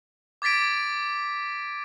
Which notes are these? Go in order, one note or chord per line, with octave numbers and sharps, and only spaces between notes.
D6 G#6 A6 B6 D7